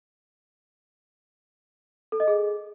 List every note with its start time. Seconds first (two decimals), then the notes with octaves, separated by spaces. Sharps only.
2.12 A4
2.20 D#5
2.28 G#4